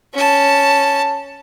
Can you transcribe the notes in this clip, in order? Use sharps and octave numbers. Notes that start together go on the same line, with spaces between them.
C#4 A5